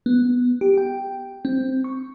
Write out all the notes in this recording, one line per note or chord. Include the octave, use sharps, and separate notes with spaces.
B3
G4
G5
C4
C#6